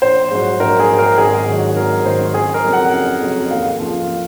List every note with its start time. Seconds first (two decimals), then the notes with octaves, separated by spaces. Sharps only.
0.02 A#1 C5
0.31 G#2 F#3
0.60 A#1 A#4
0.80 G#4
0.89 G#2 F#3
0.99 A#4
1.18 G#1 G#4
1.47 G#2 D#3 F#3
1.76 G#1 A#4
2.05 G#2 D#3 F#3 C5
2.34 F#1 G#4
2.54 A#4
2.64 F2 C#3 F#3
2.73 F#5
2.93 F#1
3.22 F2 C#3 F#3
3.51 D#2 F5
3.80 C#3 F3